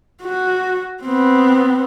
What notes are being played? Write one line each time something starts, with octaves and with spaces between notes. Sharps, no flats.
F#4
B3 C4